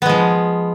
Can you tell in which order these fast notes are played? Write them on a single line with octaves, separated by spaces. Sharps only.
B3 G#3 F3